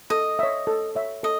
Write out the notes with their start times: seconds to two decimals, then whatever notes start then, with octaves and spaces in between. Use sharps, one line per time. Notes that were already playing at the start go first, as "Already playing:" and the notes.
0.10 A4 D#5
0.39 C#5 E5
0.67 A4
0.95 C#5 E5
1.23 A4 D#5